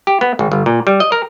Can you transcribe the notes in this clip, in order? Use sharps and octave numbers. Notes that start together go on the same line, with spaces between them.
G4
B3
G#1
G1
A#2
G3
D#5
A#4